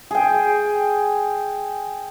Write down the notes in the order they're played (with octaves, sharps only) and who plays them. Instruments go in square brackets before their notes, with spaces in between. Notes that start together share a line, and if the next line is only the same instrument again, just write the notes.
[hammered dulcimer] G#4 G5